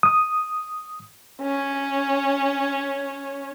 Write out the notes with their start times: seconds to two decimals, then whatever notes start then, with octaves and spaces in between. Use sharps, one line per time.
0.03 D#6
1.42 C#4 C#5